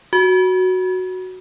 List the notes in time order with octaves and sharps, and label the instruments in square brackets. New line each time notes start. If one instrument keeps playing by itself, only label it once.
[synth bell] F#4